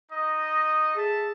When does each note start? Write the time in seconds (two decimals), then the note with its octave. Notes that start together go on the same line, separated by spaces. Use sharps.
0.11 D#4 D#5
0.96 G#4 A4 E5 A5